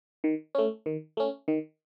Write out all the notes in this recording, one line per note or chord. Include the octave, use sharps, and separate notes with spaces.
D#3
A3 C#4
D#3
A3 C#4
D#3